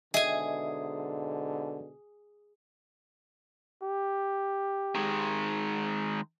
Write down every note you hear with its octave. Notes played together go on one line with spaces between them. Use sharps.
G#2 B2 D3 G#4 D#5 E5 G#5
G4
D#3 G#3